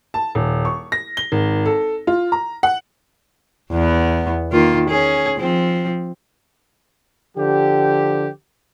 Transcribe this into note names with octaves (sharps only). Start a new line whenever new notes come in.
A5
D#1
C#6
A#6
G7
G#1
A4
F4
A#5
F#5
E2 B3
D#3 A#3 F4
C#4 G#4
F3 C4
D3 F3 G4